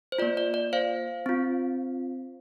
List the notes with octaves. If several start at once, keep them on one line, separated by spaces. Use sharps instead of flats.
C5
A#3 F4 D5
D5
D5
C5 F5
C4 F4